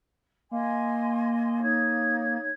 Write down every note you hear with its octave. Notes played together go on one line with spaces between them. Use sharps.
A#3 D#5 G#5 C6
D#4 C#5 G#6